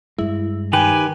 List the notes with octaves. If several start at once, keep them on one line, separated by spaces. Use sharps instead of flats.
G2 G#3 E4
D#3 G4 B4 G5 G#5